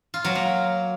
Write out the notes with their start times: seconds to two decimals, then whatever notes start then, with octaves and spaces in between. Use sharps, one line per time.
0.14 F4
0.24 F#3
0.35 A#3